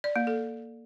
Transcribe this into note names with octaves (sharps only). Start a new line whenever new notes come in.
D5
A#3
A4